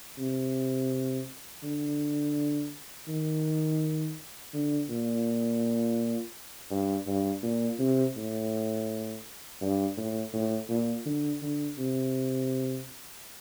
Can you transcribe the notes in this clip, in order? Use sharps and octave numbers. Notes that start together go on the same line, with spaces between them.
C3
D3
D#3
D3
A#2
G2
G2
A#2
C3
A2
G2
A2
A2
A#2
D3
D3
C3